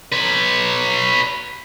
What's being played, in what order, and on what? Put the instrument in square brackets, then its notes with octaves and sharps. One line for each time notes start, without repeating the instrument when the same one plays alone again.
[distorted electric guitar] B4 C#5